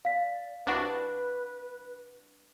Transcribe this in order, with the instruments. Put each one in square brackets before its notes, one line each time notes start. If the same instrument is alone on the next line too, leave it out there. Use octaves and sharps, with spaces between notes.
[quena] D5 [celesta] F5 B6
[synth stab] C2 D4 F#4 [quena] B4